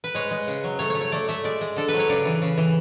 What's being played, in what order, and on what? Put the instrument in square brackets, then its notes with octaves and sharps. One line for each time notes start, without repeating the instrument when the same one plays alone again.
[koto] B4
G#3 C#5
G#3
C#3
F#3
A3 C#5
C#5
A3
C#5
A3 D5
A3 E5
G#3 D5
G#3
D3 A4
B4
F#3
C#5
C#3 D5
E3
C#3
E3